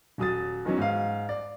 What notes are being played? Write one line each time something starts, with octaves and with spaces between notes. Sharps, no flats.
D#1 F#3 D#6 A6
D#3 E3 F#3 B3 C#4
G#2 F5
D5